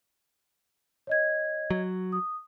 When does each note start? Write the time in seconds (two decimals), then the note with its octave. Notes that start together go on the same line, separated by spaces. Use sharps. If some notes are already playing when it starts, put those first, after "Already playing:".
1.07 C#5 D#5 G#6
1.70 F#3
2.12 D#6